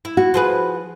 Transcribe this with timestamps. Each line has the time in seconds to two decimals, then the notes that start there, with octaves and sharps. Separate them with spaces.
0.05 E4
0.17 F#4
0.34 F3 G#4 B4